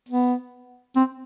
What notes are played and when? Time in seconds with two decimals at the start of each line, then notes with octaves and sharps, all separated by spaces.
0.09 B3
0.96 C4